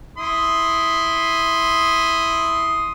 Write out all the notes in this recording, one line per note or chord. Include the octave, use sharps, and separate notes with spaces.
E4 C6 D#6